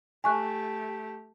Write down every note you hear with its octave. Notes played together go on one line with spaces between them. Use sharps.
A3 G4 G#5 C#6 F#6